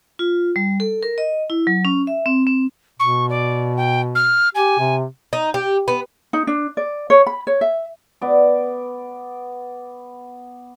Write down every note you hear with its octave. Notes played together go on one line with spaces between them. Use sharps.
F4
G3
A4
A#4
D#5
E4
F#3
C#4
E5
C4
C4
B2 C#6
D5
G5
F6
G4 G#5
C3
D#4
G4
B3
D#4
D4
D5
C#5
B5
C#5
E5
B3 D5